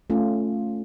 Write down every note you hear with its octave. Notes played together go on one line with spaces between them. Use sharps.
A3 C#4 F4